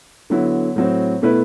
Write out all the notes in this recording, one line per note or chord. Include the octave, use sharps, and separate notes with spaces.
D3 F#3 B3 E4
A2 F#3 C4
B2 A3 E4 B4